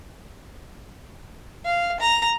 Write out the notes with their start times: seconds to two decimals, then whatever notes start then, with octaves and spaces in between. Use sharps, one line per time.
1.65 F5
2.00 A#5